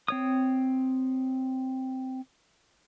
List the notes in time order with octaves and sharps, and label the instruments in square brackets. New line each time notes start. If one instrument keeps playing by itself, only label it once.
[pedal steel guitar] C4 C#5 D#6